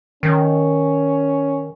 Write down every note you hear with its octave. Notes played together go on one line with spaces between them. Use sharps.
D#3 C#4